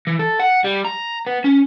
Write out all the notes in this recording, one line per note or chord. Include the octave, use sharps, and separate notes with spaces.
E3
A4
F#5
G3
A#5
B3
C#4